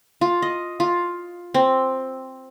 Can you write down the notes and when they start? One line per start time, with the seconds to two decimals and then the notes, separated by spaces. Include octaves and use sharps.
0.21 F4
0.42 D#5
0.80 F4
1.54 C4